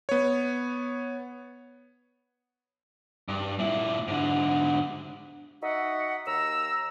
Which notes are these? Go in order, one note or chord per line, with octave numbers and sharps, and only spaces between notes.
B3 C#5
G2
A#2 E4
G#2 D3
D#4 F#4 D#5 E5 F#5
D#2 A#5 E6